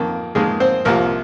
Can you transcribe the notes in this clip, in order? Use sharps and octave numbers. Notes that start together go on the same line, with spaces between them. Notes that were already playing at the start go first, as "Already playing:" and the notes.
Already playing: F2 D#3 A#3
F2 D#3 G#3 A#3 G#4
C4 C5
C2 C3 F3 A#3 A#4